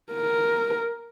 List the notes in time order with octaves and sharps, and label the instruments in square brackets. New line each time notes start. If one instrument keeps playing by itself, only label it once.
[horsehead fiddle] A#4